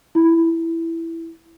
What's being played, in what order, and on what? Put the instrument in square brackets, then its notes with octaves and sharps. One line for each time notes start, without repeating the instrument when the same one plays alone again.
[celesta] E4